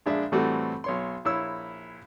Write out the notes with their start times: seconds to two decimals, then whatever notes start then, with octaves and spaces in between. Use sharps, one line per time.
0.06 A#1 G#3 D4 E5
0.32 A2 E3 G3 A3 C4 F#4
0.84 B1 C#5 C6
1.25 A#1 E4 C#5 E6